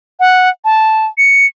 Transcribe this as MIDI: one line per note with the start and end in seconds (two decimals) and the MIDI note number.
0.20 0.49 78
0.65 1.06 81
1.18 1.46 97